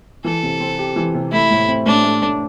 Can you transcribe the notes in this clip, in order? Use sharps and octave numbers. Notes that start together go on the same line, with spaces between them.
E3 A4
C3
C4
G4
E3
C3
A3 E4
A2
C4
A2 D4
A3
A2